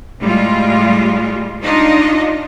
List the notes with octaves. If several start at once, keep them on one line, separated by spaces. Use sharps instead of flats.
A2 G3 G#3 F4
D4 D#4 F4 D#5